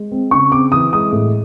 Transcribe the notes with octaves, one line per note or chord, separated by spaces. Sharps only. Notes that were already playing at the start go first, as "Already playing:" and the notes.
Already playing: G#3
C4
C#3 C#6
C4 D6
E3 D#6
G#3 D#6
A2